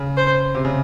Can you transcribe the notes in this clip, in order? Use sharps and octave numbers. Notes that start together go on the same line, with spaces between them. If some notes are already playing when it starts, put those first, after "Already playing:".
Already playing: C#3
C5
C3
C#3